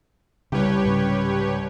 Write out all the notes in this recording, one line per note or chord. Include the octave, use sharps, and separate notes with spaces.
C2 C#3 G4 B4 C#5
G#2 C#3 C#4